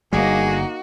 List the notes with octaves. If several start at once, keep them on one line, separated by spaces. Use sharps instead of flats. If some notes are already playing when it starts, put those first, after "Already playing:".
G1 G3 A#3 D#4 F#4 G#4